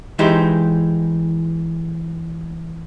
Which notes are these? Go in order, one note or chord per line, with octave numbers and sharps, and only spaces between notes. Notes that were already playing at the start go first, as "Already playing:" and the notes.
E3 G#3 D#4 G4 C5